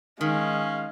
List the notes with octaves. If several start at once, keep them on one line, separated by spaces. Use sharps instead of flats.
D#3 G#3 C#4 F5